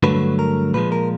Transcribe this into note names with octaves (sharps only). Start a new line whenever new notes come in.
G2 D3 F#3 A3 B4
A#4
A#2 F3 G#3 B4
A#4